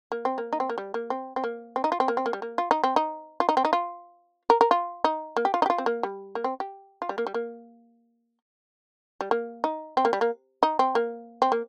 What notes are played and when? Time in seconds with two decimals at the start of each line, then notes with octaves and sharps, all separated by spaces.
0.12 A#3
0.25 C4
0.38 A#3
0.53 D#4
0.60 C4
0.70 A#3
0.78 G3
0.94 A#3
1.10 C4
1.36 C4
1.44 A#3
1.76 C4
1.84 D#4
1.92 F4
2.00 C4
2.08 A#3
2.17 C4
2.26 A#3
2.33 G3
2.42 A#3
2.58 F4
2.71 D#4
2.84 C4
2.96 D#4
3.40 F4
3.49 D#4
3.57 C4
3.65 D#4
3.73 F4
4.50 A#4
4.61 A#4
4.71 F4
5.04 D#4
5.37 A#3
5.45 G4
5.54 F4
5.62 D#4
5.66 G4
5.70 F4
5.78 C4
5.86 A#3
6.03 G3
6.35 A#3
6.44 C4
6.60 G4
7.02 F4
7.09 G3
7.18 A#3
7.27 G3
7.34 A#3
9.21 G3
9.31 A#3
9.64 D#4
9.97 C4
10.05 A#3
10.13 G3
10.21 A#3
10.63 D#4
10.79 C4
10.95 A#3
11.42 C4
11.52 A#3